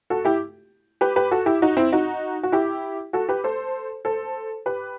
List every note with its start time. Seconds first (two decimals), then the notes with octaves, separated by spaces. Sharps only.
0.10 F#4 A4
0.25 E4 G4
1.01 G4 B4
1.16 G4 B4
1.31 F#4 A4
1.46 E4 G4
1.62 D#4 F#4
1.77 C4 E4
1.92 D#4 F#4
2.43 F#4
2.52 E4 G4
3.13 F#4 A4
3.29 G4 B4
3.44 A4 C5
4.05 A4 C5
4.66 G4 B4